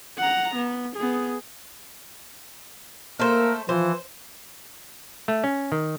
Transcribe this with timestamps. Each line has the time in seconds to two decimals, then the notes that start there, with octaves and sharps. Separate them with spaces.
0.18 F#5 A#5
0.56 B3
0.97 B3 G#4
3.20 A3 A#3 A#4 C5
3.69 E3 F3 C5
5.28 A3
5.44 C#4
5.72 D#3